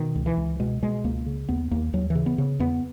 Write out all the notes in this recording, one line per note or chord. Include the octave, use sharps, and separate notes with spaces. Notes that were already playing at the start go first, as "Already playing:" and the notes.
Already playing: B2 D#3
C#2
E3
C#2
B2 G#3
B2 G#3
C#2 A#3
C#3
D#2 B3
D#2 A#3
D#2 F#3
E3
C#3
B3
C#3
E2 B3